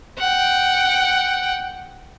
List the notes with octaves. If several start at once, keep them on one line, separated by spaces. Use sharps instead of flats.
F#5 G5